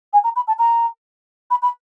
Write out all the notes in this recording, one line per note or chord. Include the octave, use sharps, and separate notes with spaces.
G#5
A#5
B5
A5
A#5
B5
B5